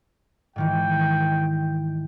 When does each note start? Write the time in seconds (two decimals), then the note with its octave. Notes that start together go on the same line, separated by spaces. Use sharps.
0.56 G#2 D#3 E3 G5